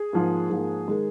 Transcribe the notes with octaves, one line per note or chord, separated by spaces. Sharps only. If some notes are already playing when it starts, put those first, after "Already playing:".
Already playing: G#4
G#2 F3 A#3
G#2 F3 A#3
D#3 G#3